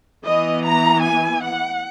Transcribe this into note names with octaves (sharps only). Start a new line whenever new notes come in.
E3 B3 D#5
A#5
G#5
F#5